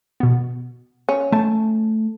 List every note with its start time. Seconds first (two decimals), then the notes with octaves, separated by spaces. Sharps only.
0.20 B2 B3
1.09 C#4
1.32 A3 A5